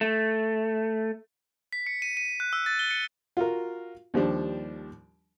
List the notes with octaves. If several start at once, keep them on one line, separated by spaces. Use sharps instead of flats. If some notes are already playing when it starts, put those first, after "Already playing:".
A3
B6
C#7
D#7
D#7
F#6
E6
A6
G7
C#7
F4 F#4 A#4
D#2 F3 G3 D4